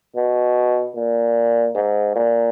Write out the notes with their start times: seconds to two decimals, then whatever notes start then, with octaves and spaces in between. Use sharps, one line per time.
0.16 B2
0.96 A#2
1.75 G#2
2.15 A#2